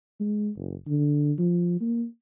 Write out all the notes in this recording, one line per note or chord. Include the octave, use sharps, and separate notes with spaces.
G#3
F#1
D3
F3
A#3